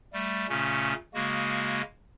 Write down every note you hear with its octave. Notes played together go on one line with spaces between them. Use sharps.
G3 A3
A#2 C#3 A3 C#4
C#3 G#3 A#3 F#4